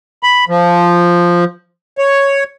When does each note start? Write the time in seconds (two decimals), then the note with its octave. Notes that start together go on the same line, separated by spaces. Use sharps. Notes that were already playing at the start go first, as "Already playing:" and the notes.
0.23 B5
0.49 F3
1.98 C#5